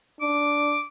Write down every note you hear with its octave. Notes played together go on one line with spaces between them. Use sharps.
D4 D6